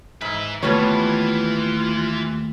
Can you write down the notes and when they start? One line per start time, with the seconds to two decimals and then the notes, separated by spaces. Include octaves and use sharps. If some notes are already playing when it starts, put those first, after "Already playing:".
0.21 G#2 B4 E5
0.63 D#2 E3 G3 A3 B3 F4 C#5 A5